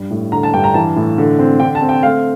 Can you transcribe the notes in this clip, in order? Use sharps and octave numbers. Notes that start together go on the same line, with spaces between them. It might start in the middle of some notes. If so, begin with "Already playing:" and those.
Already playing: G2 G3
A2
D3 A#5
A5
G2 G5
A#5
E3 A5
A2
D3
C4
D3 G5
A5
C4
G5
A3 F5